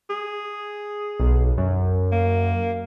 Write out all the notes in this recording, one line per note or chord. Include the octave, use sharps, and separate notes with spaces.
G#4
B1
F#2
A#3